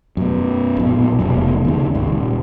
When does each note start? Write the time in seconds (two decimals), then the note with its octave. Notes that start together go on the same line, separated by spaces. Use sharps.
0.17 F#2 B2
0.77 A#1 B2
1.19 F1 C2 B2 F#3
1.65 D#2 C#3
1.95 C#2 G#2
2.08 D#1